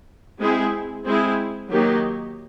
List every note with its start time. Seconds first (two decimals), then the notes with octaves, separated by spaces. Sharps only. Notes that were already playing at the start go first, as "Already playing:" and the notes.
0.40 G#3 C4 E4 G#4
1.06 G#3 C4 E4 G#4
1.71 D#3 F#3 A#3 D#4 G4